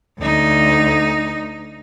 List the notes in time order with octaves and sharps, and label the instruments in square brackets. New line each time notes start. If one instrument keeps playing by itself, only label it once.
[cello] D2 D#4